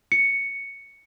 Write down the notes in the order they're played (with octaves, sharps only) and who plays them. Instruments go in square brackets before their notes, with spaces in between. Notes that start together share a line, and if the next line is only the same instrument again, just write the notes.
[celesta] C#7